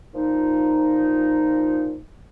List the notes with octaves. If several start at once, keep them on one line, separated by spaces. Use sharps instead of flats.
A#2 F3 D#4